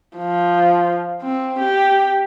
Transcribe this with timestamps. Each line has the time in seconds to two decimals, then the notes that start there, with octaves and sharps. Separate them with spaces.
0.17 F3
1.22 C4
1.59 G4